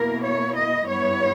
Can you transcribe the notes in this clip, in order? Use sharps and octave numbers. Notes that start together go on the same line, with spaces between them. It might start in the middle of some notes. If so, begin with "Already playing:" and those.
Already playing: B2 A#3 E4 A#4
C#5
D#5
G2 G3 B3 E4 C#5